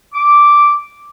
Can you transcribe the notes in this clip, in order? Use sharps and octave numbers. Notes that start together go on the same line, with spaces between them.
D6